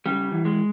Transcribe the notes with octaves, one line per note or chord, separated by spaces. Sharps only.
C#3 G3
E3
G#3